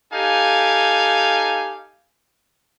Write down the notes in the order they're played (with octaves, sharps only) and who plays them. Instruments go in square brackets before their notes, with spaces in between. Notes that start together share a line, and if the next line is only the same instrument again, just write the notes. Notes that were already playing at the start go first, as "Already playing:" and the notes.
[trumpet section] D#4 G4 A4 F5 G#5